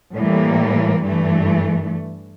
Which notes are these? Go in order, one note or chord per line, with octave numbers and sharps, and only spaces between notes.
A2 E3 G3 A#3
G2 E3 A3